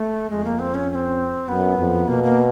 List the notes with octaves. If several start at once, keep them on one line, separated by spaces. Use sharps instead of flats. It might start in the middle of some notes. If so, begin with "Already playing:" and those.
Already playing: A3
F2 G#3
A#3
C4
C#4
C#4
C4
F#2 B3
F2
B2 A#3
A#3